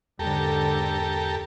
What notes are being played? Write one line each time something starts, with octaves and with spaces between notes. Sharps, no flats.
E2 G#2 D3 G4 A4 A#4